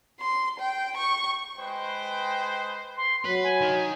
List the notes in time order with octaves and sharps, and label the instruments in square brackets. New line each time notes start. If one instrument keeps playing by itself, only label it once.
[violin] C6
G5
C#6
[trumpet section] G#3 B4 C5 [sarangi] G5
[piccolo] C6
[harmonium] F#3 [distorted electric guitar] B4 [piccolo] B6
[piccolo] G#5
[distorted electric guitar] D#3